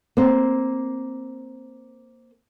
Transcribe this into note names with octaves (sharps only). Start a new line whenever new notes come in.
A#3 C4